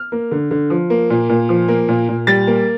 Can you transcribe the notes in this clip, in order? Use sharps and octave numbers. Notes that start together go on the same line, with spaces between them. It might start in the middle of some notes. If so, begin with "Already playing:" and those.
Already playing: F6
A#3
D3
D3
F3
A#3
A#2
A#2
F3
A#3
A#2
A#2
G3 A6
A#3